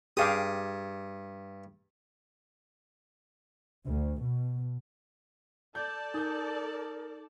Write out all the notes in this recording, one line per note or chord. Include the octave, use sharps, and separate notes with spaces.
G2 G4 G#4 F5 D#6
D2
B2
A4 D5 A5 G6
D#4 A#4 D#6 G6